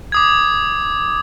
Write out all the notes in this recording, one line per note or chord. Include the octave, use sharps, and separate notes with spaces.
D6 D#6 G#6